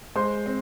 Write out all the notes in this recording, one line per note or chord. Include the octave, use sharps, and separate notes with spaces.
G#3 C5 C6
C4